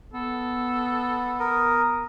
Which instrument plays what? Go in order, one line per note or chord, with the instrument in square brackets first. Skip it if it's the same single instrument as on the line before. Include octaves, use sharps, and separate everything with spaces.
[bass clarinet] B3 [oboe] A4
[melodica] A#4 [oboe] D#6